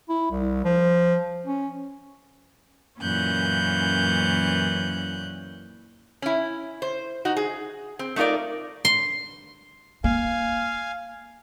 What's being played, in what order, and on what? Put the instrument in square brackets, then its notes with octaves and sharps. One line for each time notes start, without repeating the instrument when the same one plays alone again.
[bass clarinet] E4
C2
F3
C#4
[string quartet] F#2 A#2 E3 C#4 F#6 G6
[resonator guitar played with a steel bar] C#4 E4
C5
D#4 F#4
G#4
C4
A3 D#4 F4 A#4 D5
[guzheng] C6
[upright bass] A#3 [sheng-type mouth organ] F5 G#5